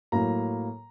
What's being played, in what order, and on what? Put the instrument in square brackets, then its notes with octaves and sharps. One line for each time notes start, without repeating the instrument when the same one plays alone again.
[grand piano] A2 F#3 A#3 A#5